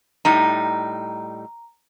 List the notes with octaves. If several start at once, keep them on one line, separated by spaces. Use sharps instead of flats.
A2 G3 D#4 A#5